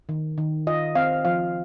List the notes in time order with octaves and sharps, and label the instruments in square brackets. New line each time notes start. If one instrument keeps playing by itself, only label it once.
[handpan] D#3
D#3
F4 D#5
C4 F5
F3 F5